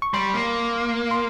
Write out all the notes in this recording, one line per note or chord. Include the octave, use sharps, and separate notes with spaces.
C#6
G3 C6
A#3
C6